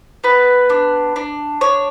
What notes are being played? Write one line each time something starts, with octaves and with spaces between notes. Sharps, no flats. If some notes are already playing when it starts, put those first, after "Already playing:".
B3 B4
D4
D4
D4 C#5